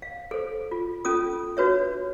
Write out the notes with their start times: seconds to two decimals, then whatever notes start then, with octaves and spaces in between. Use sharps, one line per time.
0.02 F5
0.31 A4 C5
0.71 F4
1.05 C#4 F4 A4 D#6
1.57 D4 F#4 B4 C#5 E5